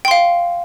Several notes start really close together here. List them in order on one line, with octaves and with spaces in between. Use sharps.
G5 C6 F5